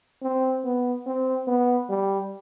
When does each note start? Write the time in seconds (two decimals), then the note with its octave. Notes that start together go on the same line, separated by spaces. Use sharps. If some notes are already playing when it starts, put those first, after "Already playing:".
0.22 C4
0.64 B3
1.07 C4
1.47 B3
1.90 G3